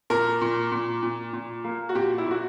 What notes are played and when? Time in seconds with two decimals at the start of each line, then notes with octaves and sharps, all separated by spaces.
0.10 A#2 A#4
0.41 A#2
0.72 A#2
1.03 A#2
1.33 A#2
1.64 A#3
1.89 F#4
1.95 A#2 G4
2.18 E4
2.26 A#2 F#4